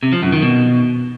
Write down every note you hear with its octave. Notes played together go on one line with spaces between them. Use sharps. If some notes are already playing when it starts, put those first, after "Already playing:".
C3
F3
F#2
D#3
B2